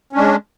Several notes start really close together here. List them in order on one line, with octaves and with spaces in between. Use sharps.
C#4 D4 G#3